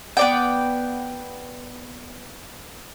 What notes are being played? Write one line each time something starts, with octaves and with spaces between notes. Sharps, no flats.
B3 D5 G5